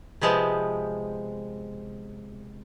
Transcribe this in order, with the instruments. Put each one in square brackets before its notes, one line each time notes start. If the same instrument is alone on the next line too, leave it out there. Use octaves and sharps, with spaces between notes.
[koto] C3 F3 G#3 B3 C4